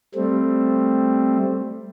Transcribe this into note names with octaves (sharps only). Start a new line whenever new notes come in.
G3 A3 C4